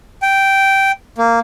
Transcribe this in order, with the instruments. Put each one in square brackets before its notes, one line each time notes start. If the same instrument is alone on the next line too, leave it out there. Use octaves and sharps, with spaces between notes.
[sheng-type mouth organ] G5
A#3